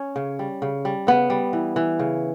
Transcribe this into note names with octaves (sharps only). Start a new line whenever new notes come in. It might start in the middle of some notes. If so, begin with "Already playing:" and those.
Already playing: C#4
C#3
G3
C#3
G3
C#3 B3
G3
E3
E3
C#3